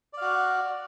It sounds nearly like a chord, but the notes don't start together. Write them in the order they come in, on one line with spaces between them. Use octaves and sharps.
D5 F5 F#4